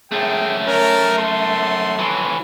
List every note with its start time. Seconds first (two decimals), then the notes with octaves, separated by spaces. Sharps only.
0.12 F#2 A3 G#4 G5
0.67 C#4 A#4
1.18 A4 C6
1.99 E3 F#3